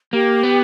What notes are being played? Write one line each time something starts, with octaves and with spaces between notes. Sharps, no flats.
A#3 G4
B3